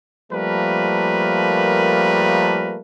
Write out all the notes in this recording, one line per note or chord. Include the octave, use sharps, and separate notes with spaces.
F3 G3 A3 A#3 A#4 B4